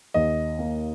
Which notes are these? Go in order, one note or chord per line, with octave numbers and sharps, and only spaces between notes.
D#2 D#5
A#3